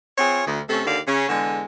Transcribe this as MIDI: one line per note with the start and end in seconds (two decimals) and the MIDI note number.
0.18 0.43 60
0.18 0.43 65
0.18 0.43 68
0.18 0.43 73
0.46 0.61 38
0.69 0.84 48
0.69 0.84 57
0.69 0.84 61
0.69 0.84 69
0.85 0.99 39
0.85 0.99 50
0.85 0.99 74
0.85 0.99 77
1.07 1.28 49
1.07 1.28 61
1.28 1.64 40
1.28 1.64 50
1.28 1.64 56